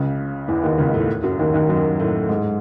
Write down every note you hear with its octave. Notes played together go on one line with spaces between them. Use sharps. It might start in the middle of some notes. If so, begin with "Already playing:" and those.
Already playing: C#2 C#3
E2 E3
D#2 D#3
C#2 C#3
A2 A3
F#2 F#3
D#2 D#3
D#2 D#3
F#2 F#3
A2 A3
G#2 G#3